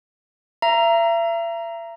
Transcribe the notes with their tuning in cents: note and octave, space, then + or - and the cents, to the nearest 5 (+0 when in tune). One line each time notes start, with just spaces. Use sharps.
E5 +40 A#5 +0